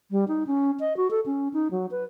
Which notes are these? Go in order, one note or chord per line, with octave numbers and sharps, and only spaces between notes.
G3
D#4
C#4
D#5
F#4
A4
C#4
D#4
F#3
B4